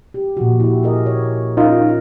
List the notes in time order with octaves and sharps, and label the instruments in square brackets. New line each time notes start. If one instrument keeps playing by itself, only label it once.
[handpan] G4
A#2 F3 F#4
E4 G4
G#4 A#4 D#5
C#5
[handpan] C#4 A#4 [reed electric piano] D#4 F4